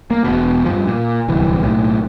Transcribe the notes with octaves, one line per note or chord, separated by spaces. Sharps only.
A#3
E1 B2
G2 F3
A#2
D1 C2 E3
B1 A2